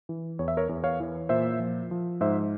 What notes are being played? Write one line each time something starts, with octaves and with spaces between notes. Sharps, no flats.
E3
E2 C#5
E5
A#4 C#5
E2
C#5 F5
E3
A#2 C5 E5
F3
F3
G#2 C5 E5